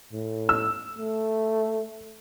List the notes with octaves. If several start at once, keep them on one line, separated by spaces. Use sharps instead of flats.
A2
E6
A3